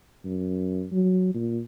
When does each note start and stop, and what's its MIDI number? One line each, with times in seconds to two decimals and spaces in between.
0.25 0.86 42
0.92 1.30 54
1.34 1.60 46